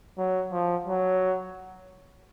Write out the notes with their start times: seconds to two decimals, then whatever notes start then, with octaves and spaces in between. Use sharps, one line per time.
0.18 F#3
0.52 F3
0.87 F#3